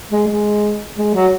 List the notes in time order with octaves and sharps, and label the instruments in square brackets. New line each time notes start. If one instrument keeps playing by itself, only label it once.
[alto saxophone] G#3
G#3
G#3
F#3